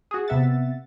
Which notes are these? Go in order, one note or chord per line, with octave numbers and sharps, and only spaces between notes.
F#4 G#4
C3 B3 E5 F#5 A6